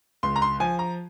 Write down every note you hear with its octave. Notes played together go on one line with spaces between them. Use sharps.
C#2 C6
A#5
C6
F3 G#5
A#5